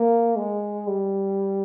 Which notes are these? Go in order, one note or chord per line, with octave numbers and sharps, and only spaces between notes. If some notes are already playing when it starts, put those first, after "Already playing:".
Already playing: A#3
G#3
G3